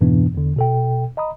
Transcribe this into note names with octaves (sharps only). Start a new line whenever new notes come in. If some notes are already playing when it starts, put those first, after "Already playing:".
F2 G#2 B2 E3 B3 D4
E2 D3
B2 A4 G5
D#5 A#5 B5 D#6